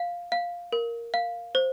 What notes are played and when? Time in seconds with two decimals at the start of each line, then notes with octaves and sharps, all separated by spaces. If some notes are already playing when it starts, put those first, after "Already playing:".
Already playing: F5
0.32 F5
0.72 A#4
1.14 F5
1.55 C5